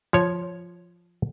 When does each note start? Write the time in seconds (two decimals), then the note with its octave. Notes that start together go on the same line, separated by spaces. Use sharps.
0.13 F3 C#5